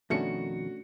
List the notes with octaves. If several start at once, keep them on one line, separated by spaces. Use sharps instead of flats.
F2 B2 D#3 A3 C#4 D4 F#4 C#7